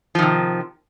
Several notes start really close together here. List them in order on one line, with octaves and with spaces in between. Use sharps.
F3 D#3 C3